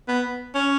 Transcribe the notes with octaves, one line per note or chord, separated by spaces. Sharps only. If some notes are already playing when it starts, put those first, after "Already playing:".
B3
C#4